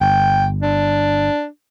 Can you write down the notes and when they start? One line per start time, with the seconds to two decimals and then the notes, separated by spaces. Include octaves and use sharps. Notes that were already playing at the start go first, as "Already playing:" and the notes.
0.01 G1 G5
0.63 D4